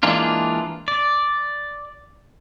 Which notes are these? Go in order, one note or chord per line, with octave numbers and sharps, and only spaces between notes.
E3 G#3 A#3 D4 F4
D5